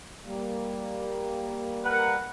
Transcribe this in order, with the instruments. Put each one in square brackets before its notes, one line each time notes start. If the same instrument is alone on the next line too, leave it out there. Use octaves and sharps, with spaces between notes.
[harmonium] G3 A#3
[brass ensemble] A#4 F#5 [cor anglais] B4